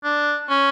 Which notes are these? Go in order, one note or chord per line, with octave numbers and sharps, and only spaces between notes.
D4
C#4